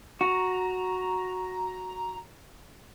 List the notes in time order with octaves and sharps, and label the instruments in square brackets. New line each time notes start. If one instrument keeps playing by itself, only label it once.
[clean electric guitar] F#4 [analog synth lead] A#5